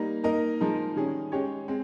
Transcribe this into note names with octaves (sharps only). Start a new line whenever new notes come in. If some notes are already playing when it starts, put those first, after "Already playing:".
Already playing: G3 A#3 D#4
A#3 D#4 A#4 D#5
F3 G#3 D#4 A#4
D#3 G3 C#4 G#4
G#3 C#4 G4 C#5
G#3 C4